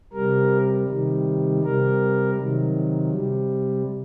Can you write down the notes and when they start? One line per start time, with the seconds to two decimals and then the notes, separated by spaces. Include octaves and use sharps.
0.13 C3 G3 A#4
0.88 C3 D#3 G3
1.63 C3 G3 A#4
2.38 C3 D#3 F#3
3.12 C3 G3